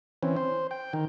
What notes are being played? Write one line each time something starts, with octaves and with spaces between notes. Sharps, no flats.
E3 C4 C#4
C5
G5
D#3